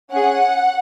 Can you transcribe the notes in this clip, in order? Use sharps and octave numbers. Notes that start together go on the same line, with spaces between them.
C#4 G#4 F#5